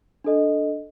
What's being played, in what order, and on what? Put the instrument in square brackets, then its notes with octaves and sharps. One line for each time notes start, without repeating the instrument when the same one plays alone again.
[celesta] D4 A4 D#5